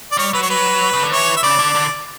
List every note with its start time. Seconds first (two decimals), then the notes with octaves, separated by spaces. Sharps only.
0.12 D5
0.17 G3 C#5
0.33 F#3 B4
0.42 C#5
0.50 B4
0.93 C#3
1.03 D3
1.11 E3 C#5
1.37 E5
1.43 C#3 D5
1.59 D3
1.75 D3